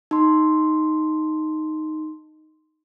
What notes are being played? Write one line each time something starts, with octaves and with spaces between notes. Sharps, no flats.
D#4 C6